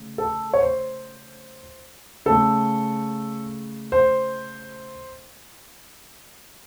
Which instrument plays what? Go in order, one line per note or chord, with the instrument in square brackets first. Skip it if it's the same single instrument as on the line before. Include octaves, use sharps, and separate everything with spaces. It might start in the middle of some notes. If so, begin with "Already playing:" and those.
Already playing: [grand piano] C#3 A3
A4
C#5
C5
C#3 A3 A4
C5